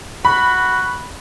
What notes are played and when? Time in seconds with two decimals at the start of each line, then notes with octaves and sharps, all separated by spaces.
0.25 F#4 B5